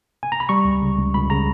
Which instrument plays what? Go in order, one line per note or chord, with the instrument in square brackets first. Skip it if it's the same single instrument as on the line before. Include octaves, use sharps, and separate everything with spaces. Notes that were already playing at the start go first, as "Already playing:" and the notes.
[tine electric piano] G#5
A#5
B5
G3 C#6
C#2
C#3
C#2
C#2 B5
C#3 A#5